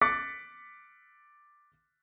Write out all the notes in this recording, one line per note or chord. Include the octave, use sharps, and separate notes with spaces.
D6 F#6 A6 B6 C#7